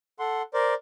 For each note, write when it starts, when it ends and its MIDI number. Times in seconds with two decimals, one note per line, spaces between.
0.19 0.42 69
0.19 0.42 78
0.19 0.42 84
0.54 0.74 70
0.54 0.74 72
0.54 0.74 74